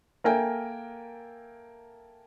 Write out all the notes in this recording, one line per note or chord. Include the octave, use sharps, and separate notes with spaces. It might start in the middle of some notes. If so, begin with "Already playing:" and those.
A#3 A4 A#4 E5 G5 G#5